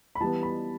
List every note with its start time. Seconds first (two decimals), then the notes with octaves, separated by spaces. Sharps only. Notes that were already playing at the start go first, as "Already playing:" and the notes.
0.15 B5
0.20 E3 G3 B3 A5
0.43 B5